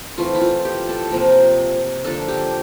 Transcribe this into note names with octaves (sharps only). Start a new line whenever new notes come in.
E3 A3 C4 F4
E4
F4
G4
A4
C3 F3 A#3 A#4
D3 F3 A#3 D4 A4
G4